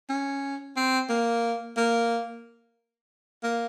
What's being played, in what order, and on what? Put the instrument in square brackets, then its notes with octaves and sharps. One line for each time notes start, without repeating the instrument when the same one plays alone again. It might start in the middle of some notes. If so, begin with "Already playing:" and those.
[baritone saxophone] C#4
C4
A#3
A#3
A#3